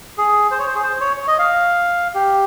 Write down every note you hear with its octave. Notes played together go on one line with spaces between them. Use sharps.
G#4
C5
C#5
C5
G#4
C5
C#5
C#5
D#5
F5
G4